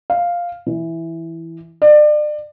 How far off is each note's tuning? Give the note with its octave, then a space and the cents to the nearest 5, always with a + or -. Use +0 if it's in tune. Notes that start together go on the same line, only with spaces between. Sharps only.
F5 +0
E3 +0
D5 +35